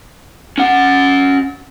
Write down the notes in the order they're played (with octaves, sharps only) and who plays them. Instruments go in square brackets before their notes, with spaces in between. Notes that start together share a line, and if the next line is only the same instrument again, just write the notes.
[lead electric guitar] C#4 F#5